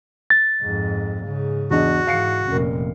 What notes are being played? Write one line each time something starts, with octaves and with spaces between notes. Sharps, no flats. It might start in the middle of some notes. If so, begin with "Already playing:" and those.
A6
F2 G#2
G#2 C#3
E2 D4 F#4 D#5
G#2 E3 F5 C7 C#7
F1 A#2 C#4 A#4